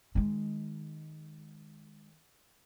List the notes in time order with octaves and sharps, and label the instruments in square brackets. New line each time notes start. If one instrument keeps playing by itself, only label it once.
[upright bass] D#3 G#3